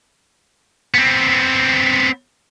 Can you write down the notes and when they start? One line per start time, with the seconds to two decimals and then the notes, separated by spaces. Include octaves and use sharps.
0.94 B3 C4